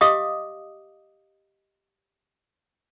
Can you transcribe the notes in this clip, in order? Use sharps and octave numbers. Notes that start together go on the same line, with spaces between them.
G4 D#5 F5 D6 D#6